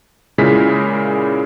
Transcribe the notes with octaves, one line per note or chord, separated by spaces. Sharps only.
A#2 C#3 G#3 E4 A#4 B6